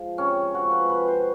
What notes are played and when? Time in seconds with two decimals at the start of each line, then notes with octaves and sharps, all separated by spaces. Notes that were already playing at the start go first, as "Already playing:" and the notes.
Already playing: G#2 F3
0.18 C3 C#4
0.54 F3 F#4
0.72 B4
0.89 C3 B4
1.08 C5